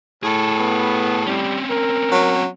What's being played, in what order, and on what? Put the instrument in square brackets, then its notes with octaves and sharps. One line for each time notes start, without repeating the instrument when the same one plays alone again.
[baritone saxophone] A2 [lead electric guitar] G#4 A4
[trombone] B3
[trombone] G3 [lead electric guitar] C4 C#4
[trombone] A#4
[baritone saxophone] F#3